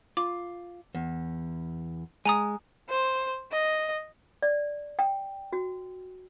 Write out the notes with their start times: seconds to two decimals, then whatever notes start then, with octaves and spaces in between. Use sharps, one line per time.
0.17 F4 D6
0.95 E2
2.25 G#3 G#5 A#5 D#6
2.89 C5
3.51 D#5
4.42 D5
4.99 G5
5.53 F#4